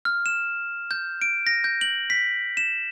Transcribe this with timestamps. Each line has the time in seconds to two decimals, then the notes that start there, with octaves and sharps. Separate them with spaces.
0.05 F6
0.26 E7
0.91 G6
1.21 D7
1.47 A#6
1.64 G6
1.81 F#7
2.10 B6
2.57 E7